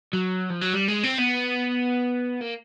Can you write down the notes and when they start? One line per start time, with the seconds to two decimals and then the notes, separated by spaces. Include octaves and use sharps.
0.13 F#3
0.50 F3
0.61 F#3
0.73 G3
0.88 G#3
1.04 C4
1.18 B3
2.41 A#3